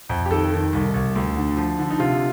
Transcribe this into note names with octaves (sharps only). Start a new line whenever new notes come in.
F2
G4
D#3 A4
D#3
C2
C2
D2
D3
F3
D3
D#4
C3 F4